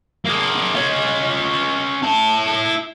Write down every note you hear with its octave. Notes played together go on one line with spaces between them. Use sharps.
A#3 G#4
C#4 F4
E4 A5